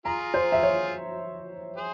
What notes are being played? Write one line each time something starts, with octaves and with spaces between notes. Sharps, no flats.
F4 G#4 A#5
C5
E5
C#5
G#4 C5